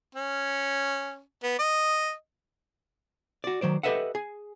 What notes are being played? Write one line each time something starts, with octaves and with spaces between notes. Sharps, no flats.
C#4
B3
D#5
F#4 D5
D#3 F#3 C5 D5
G4 A4 B4 D#5 E5 F#5
G#4